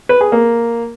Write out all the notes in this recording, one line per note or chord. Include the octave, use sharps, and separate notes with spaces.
B4
G#4
A#3